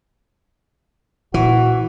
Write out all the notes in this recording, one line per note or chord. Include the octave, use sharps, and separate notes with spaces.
A#2 E3 F#4